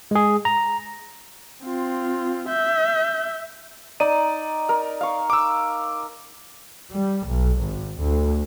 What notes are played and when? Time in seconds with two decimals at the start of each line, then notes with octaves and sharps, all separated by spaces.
0.11 G#3 G#4
0.45 A#5
1.64 C4 F4
2.49 E5 G6
4.00 D#4 D5 D#7
4.69 A#4
5.01 F5 C#6
5.30 D6 E6
6.91 G3
7.26 B1
7.60 G#1
8.02 D2